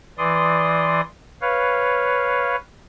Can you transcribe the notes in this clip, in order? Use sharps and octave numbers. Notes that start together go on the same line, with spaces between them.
E3 D5 C6 D#6
B4 C#5 F5